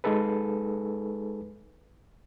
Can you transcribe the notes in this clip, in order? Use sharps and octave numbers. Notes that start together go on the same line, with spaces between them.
G#3 D#4 G#4 A4 B4